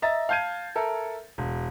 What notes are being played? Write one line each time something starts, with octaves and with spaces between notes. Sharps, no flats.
D#5 E5 A#5 A6
F5 A5 G6 G#6 D#7
A4 A#4 E5
E1